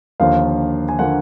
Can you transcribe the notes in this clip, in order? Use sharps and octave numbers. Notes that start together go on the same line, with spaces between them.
D#2 D3 F3 A#3 F5
G#5
D3 F3 A#3 F#5